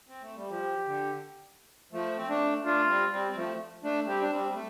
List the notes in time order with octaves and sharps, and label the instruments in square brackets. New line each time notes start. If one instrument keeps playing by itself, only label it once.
[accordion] C4
A3
G3
[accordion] F3 [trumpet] G4
[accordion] D3
F3 A3
C4
A3 D4
[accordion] A3 D4 [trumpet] F4
[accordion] G3 C4
G3 C4
C4
F3 A3
A3 D4
[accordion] G3 C4 [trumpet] G4
[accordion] D4
G3 C4
G3
A3